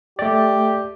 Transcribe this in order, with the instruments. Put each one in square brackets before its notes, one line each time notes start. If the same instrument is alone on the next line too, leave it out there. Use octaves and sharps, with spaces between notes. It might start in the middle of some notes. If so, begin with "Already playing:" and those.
[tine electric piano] A3 D5 [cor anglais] G4